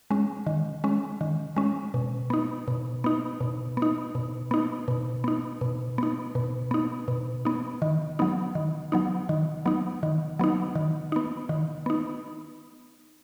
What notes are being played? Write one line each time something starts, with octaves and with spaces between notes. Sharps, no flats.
G#3 C#4
D#3
G#3 C#4
D#3
G#3 C#4
B2
B3 D#4
B2
B3 D#4
B2
B3
D#4
B2
B3 D#4
B2
B3 D#4
B2
B3 D#4
B2
B3 D#4
B2
B3 D#4
D#3
F#3 B3 D#4
D#3
F#3 B3 D#4
D#3
F#3 B3 D#4
D#3
F#3 B3 D#4
D#3
B3 D#4
D#3
B3 D#4